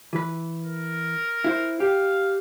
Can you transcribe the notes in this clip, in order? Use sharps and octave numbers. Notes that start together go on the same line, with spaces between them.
E3 B4
A#4
E4 C5
G4 F5